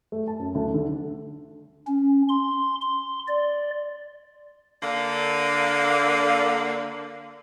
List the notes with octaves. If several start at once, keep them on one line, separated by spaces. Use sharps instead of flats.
A3
A5
F#2
D2
D3
C#4
C6
C6
D5
D3 A#3